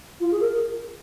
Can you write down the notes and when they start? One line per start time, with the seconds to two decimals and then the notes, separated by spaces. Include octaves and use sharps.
0.20 F4
0.31 G#4
0.40 A#4